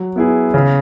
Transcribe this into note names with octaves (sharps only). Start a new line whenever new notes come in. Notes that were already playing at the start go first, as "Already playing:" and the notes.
Already playing: F#3
B3 E4 G#4
C#3